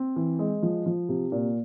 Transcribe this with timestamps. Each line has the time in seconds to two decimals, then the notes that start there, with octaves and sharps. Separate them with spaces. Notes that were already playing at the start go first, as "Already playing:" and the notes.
Already playing: C4
0.16 E3
0.39 G#3
0.63 F3
0.86 F3
1.09 C3
1.32 A#2